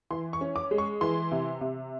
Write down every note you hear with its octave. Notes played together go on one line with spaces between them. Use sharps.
E3 C6
C#6
C#4
D6
G#3
C#6
E3 C6
C3
C3